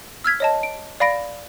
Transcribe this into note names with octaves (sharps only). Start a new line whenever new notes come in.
E6 F6 G#6 B6
C#5 D#5 A5
D7
D5 F5 B5 A#6 D7